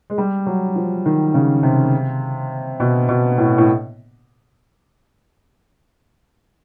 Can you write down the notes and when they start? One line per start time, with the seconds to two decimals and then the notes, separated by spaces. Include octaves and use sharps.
0.10 G#3
0.18 G3
0.46 F#3
0.76 F3
1.06 D#3
1.34 C#3
1.63 C3
2.80 B2
3.09 B2
3.38 A2
3.58 A2